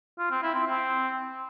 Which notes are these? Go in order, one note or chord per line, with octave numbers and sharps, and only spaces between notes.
F4
C4
E4
C4
C4